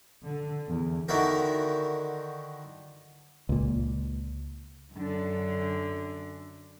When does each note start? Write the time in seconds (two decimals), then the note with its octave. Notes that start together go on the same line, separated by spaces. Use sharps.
0.24 D3
0.67 E2
1.08 D3 D#3 E4 F#4 A#4
3.49 C#2 A#2
4.93 F#2 D3